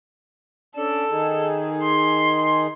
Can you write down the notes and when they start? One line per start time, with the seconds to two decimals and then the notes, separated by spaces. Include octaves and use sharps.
0.76 C#4 D4 A4 D5
1.10 D#3 D#4 G#4
1.82 C6